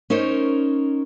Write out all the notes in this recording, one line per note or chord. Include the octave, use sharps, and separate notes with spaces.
C#4 D#4 A#4 C5 C#5